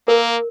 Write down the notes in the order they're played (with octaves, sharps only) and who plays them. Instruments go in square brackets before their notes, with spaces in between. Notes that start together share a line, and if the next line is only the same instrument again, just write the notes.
[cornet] A#3 [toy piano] A#4